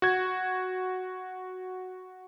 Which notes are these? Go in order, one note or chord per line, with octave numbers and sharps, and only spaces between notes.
F#4 G#6